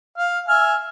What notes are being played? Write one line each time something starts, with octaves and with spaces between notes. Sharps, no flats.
F5
E5 G#5 F6